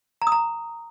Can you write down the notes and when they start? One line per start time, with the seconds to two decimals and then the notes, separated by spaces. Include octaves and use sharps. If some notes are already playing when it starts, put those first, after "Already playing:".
0.22 A#5
0.27 D#6
0.32 A#5